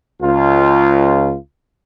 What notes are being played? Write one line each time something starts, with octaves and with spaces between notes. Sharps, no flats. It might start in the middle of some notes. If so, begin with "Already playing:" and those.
C#2 F4